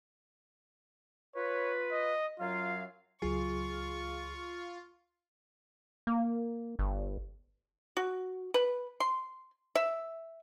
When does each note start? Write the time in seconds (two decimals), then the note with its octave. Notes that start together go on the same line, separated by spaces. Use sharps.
1.35 F4 B4 C#5
1.92 D#5
2.40 F#2 F#3 F4 F5
3.22 C#2 F#3 F4 G#4 C#6
6.07 A#3
6.79 G1
7.97 F#4
8.54 B4
9.00 C6
9.75 E5